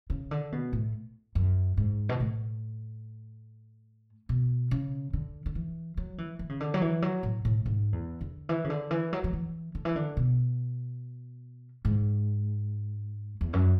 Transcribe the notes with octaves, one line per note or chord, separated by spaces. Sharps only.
C#3
D3
B2
A2
F#2
G#2
B2
A2
B2
C#3
D3
D3
E3
F#3
E3
E3
C#3
D3
F#3
E3
F#3
A2
A2
G#2
E2
D3
E3
C#3
D3
E3
F#3
F#3
E3
D3
E3
D3
B2
G#2
E2
F#2